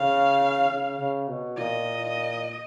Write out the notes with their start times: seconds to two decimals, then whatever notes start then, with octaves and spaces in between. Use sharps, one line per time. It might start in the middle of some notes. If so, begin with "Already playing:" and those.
Already playing: C#3 F5
0.69 C#3
0.99 C#3
1.28 B2
1.57 A#2 D#5